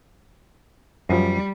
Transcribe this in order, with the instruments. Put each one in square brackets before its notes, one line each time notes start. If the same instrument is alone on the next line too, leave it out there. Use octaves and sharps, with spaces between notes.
[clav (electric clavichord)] F#2 F3 [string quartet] G3